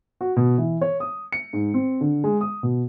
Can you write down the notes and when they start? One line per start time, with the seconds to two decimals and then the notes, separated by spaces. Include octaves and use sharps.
0.21 F#4
0.36 B2
0.58 E3
0.81 C#5
1.00 D#6
1.32 C#7
1.53 G#2
1.74 C4
2.01 D3
2.24 G#3
2.41 D#6
2.63 B2